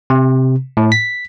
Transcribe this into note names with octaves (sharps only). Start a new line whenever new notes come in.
C3
A2
B6